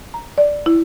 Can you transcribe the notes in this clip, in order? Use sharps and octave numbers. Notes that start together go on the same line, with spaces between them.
A#5
D5
E4